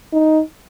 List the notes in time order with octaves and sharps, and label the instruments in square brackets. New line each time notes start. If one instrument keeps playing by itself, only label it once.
[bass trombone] D#4